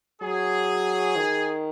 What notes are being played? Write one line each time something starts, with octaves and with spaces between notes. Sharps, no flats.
F#3 G#4
D#3